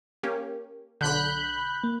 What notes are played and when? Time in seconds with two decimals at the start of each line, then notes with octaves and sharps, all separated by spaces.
0.23 A#3 C#4 G4
1.01 B1 D3 B5 F#6 G6
1.84 A#3